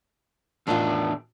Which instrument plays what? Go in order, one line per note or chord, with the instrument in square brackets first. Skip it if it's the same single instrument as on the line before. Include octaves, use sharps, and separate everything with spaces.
[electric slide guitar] E2 D4 [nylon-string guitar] A2 D#3 F4